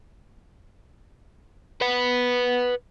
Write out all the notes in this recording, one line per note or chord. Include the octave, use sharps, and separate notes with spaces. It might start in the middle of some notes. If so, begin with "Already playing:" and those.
B4 F#5